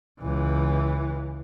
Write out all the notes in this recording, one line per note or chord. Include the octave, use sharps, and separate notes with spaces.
C#2 E3